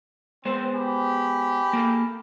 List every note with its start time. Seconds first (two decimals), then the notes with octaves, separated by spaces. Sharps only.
0.45 G#3 B3 C4 C5
0.76 G4 G#4 B5
1.73 A#3 A4